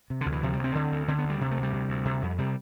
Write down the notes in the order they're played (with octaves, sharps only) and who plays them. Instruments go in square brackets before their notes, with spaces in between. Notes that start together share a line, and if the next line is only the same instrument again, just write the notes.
[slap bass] C3
D3
D2
E3
C3 F3
G3
D2
C4
D3
D2
D3 C4
B3
D2
G3
C3
A3
D2
G3
C3
D2
C3
F2
C3 G3